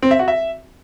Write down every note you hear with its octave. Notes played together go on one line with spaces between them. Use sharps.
C4
E5
F#4
E5